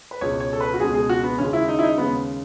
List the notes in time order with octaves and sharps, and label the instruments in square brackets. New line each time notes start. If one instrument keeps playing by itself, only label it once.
[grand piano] B4
C#2 B2 G#3 C#5
C#5
A4
B4
F#4
C#2 B2 G#3 G#4
G#4
F#4
B3
D#2 C#3 G#3 C#4
E4
D#4
E4
D#4
D#2 C#3 G#3 B3